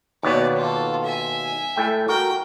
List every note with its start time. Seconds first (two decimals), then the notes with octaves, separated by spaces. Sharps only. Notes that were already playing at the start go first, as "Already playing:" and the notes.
0.23 D#2 B2 B3 C#5 D5
0.56 F4 A4
1.04 E5 G#5
1.76 A2 A3 G5
2.09 F#4 A#4 G5